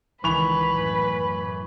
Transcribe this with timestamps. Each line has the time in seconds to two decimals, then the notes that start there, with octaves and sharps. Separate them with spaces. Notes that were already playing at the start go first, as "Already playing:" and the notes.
0.24 C#2 D#3 E3 B4 B5 C#6 F7
0.68 F#2 A2